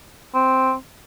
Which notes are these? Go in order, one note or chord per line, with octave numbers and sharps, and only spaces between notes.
C4